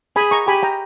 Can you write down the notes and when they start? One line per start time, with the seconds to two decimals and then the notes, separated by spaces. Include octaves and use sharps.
0.16 G#4 G#5 B5
0.31 A#5 C#6
0.47 G4 G#5 B5
0.63 G5 A#5